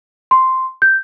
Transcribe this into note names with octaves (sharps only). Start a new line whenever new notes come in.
C6
G6